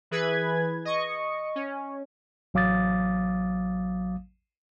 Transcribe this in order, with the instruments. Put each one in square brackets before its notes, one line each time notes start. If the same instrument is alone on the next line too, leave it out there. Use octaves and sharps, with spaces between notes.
[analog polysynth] E3 G#4 B4 G#6
D#5 C#6
C#4
[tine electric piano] A1 F#3 F5 D6 D#6 A6